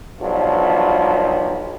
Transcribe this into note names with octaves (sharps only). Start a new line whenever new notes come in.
B1 G2 F3